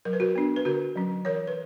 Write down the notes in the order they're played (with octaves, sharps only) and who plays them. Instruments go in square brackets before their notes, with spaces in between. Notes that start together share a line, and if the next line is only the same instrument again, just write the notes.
[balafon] F#3 A#4
B4
F#4 A#4
B3 D4
B4
D3 F#4 A#4
F#3 C#4
E3 A#4 C#5
B4